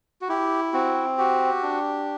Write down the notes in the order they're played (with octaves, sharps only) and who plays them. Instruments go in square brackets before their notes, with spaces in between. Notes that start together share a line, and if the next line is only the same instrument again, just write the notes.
[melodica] F#4
E4 G4
C4 F#4
F#4 G4
D4